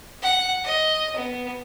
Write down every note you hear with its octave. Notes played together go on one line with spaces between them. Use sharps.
F#5
D#5
B3